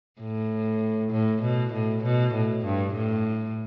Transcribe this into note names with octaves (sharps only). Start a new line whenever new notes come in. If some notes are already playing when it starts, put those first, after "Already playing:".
A2
A2
B2
A2
B2
A2
G2
A2